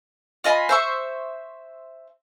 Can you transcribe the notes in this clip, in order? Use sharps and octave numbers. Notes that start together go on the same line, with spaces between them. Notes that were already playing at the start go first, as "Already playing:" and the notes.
F4 D#5 G#5 B5
C5 E5 C#6